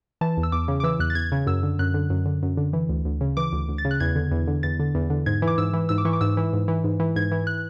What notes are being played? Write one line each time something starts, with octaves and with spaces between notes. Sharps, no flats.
E3 A5
E2
E6
E2 D6
C#3
D6
E3 E6
E2 F#6
A6
E2 G#6
C#3
F#2 E6
D3
F#2 F#6
D3
F#2
D3
F#2
D3
E3
D2
D2
C#3
E3 D6
D2
D2
A6
C#3
F#6
E2 G#6
D3
E2
D3
E2 A6
D3
E2
D3
G#2 G#6
E3
D6
G#2 E6
E3
G#2 E6
D6
E3 C#6
D6
G#2 E6
E3
G#2
E3
G#2
E3
G#2 G#6
E3
F#6